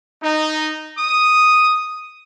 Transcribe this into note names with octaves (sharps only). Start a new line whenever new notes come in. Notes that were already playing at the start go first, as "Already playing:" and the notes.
D#4
D#6